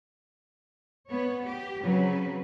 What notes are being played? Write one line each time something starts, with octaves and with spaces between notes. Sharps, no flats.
B3 C#5
G4
C#3 F#3 C4 B4